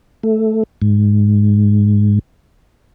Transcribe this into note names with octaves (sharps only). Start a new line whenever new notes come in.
A3
G#2